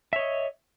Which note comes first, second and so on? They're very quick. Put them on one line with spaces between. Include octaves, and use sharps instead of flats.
E5 C#5 D#5